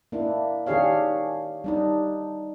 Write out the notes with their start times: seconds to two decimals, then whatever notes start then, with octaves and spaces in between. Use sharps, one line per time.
0.12 A#3 D4 E4
0.67 D#3 D4 G4 G#4 C#5 F5
1.64 G3 D4 D#4